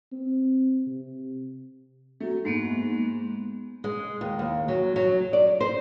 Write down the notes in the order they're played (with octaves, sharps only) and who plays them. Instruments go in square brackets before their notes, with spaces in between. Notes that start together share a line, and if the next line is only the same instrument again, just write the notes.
[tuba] C4
C3
[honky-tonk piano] F#3 A3
[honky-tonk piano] G#2 [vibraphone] G#3 A#3 B3
[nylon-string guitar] G#3
D#2
D#2
F#3
F#3
D5
C5